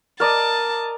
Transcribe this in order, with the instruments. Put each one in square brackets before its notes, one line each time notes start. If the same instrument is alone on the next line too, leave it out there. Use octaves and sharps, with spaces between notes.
[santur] A#4 D5 D#5 [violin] A5